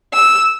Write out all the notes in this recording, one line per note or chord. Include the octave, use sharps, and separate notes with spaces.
E6